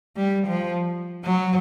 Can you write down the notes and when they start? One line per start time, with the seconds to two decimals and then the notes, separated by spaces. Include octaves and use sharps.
0.16 G3
0.47 F3
1.25 F#3